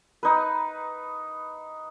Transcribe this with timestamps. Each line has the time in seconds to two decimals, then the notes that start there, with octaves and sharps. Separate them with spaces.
0.23 D#4 B4